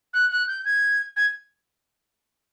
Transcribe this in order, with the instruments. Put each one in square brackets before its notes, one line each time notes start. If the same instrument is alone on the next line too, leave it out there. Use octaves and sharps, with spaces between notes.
[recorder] F#6
F#6
G6
G#6
G#6